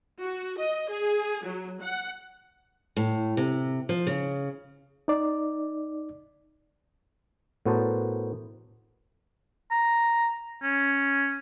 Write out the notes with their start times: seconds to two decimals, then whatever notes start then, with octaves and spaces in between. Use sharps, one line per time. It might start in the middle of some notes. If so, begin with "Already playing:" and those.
0.21 F#4
0.58 D#5
0.91 G#4
1.44 F#3
1.82 F#5
2.97 A2
3.37 C3
3.89 F3
4.07 C#3
5.08 D#4 D5
7.65 A2 B3 F#4 A#4 C5 A5
9.71 A#5
10.63 C#4